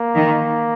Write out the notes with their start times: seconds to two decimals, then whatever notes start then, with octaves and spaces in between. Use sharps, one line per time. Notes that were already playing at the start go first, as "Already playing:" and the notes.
Already playing: A#3
0.16 D#3